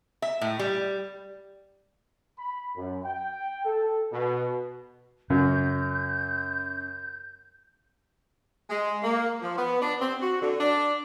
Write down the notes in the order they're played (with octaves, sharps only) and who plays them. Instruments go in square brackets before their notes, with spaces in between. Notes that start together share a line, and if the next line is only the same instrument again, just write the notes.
[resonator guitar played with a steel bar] E5
A2
G3
[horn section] B5
F#2
G5
A4
B2
[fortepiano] F#2 F#4 [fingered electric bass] C#3 [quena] G6
[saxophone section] G#3
A#3
F3
B3
D4
C4
F#4
D3
D4